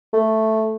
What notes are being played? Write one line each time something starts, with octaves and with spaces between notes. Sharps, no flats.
A3